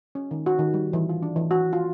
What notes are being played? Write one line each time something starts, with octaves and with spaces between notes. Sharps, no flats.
C#4
D#3
F#4
D#3
G3
E3
F4
D4
E3
F#4
F4